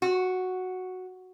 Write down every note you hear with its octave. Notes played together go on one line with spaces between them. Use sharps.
F#4